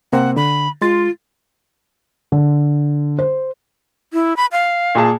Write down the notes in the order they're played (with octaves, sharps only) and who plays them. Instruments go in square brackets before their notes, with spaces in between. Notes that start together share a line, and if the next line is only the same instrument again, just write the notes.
[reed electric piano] C3 A#3 C4 [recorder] F#5
[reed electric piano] D3 [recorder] B5
[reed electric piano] G#3 C6 A6 [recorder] F4
[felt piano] D3
C5
[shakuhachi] E4
B5
F5
[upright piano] A#2 G#4 A5